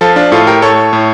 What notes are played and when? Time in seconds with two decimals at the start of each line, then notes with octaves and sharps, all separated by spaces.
0.01 F3 F4 A4
0.16 D4 F4
0.32 A2 F4 A4
0.47 G4 A#4
0.62 A2 A4 C#5
0.93 A2